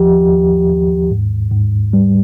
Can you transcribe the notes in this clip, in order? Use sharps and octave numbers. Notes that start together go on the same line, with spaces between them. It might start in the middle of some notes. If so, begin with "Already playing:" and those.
Already playing: D#2 F3 G4
D#2
D#2
G#2
G#2
G3